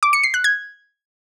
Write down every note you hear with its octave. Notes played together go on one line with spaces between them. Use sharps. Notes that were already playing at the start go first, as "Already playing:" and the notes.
D6
C#7
C7
F#6
G#6